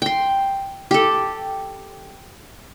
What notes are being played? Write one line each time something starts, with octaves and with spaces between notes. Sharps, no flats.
G5 C6
G4 A4